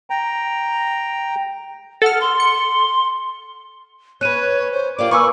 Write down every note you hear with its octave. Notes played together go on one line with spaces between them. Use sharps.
G5 A#5
A4 F#5 F6
C6
C#7
C#4 B4 C#5 F#6 D#7
C5
A#3 F4 G4 A#4 D5 D6
B4 G#5 C#6 D6 E6